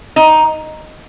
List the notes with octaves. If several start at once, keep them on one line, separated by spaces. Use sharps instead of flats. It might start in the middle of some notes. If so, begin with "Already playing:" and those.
D#4